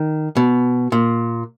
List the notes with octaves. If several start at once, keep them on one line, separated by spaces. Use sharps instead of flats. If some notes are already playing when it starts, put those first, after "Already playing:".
Already playing: D#3
B2
A#2